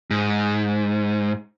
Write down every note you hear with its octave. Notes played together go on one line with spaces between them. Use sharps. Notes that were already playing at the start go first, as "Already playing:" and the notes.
G#2